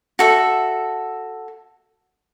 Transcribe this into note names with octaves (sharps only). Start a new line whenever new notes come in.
F#4 A4 E5